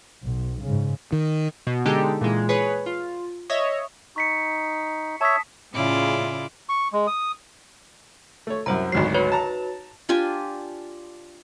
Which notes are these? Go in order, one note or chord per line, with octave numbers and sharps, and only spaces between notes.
B1
G#2 C#3
D#3
B2
D3 G#3 D#4 G4 A4
A#2 E3 G#3
G#4 B4 C#5
F4
C#5 D#5 E5
D#4 C#6 B6 C#7
C#5 E5 A5 D#6 B6
A2 C#3 E4 F4 D5
C#6
G#3
D#6
A3 C#5
C2 F#2 C5 A#5
G#1 D2 F#3 C7
F#4 B4 C#5
A5 A#5
D4 F4 G4 G#5